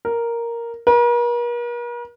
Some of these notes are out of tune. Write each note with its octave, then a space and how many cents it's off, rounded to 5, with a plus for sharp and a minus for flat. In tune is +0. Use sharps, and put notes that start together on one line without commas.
A#4 +0
A#4 +45